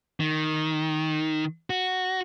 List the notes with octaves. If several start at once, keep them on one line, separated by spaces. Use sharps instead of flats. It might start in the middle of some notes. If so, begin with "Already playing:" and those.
D#3
F#4